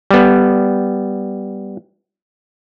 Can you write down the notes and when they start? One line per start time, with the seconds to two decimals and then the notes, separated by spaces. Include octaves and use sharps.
0.11 G3 B3